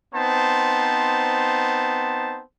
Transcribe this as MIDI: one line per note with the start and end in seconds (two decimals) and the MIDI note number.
0.14 2.42 59
0.14 2.42 60
0.14 2.42 63
0.14 2.42 72
0.14 2.42 81